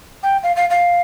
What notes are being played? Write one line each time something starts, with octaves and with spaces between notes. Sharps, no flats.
G5
F5
F5
F5